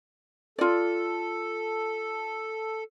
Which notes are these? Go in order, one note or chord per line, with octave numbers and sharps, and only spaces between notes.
F4 A4 D5